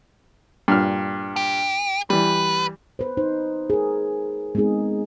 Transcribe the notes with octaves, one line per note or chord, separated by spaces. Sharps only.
G2 A#2 F6
G4
E3 G3 B4
B4 C5
D#4 C5
G#4 A#4
G#3 B3 C4 D#4 G#4